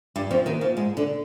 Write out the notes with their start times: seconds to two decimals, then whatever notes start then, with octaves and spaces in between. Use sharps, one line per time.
0.16 G2 G3
0.31 F2 F3
0.46 D#2 D#3
0.61 F2 F3
0.77 G#2 G#3
0.97 D3